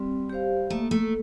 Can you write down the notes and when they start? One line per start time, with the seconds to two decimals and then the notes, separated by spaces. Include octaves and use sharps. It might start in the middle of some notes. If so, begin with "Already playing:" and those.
Already playing: G3 C4
0.30 G4 C5 F5
0.70 A3 A#3
0.91 A3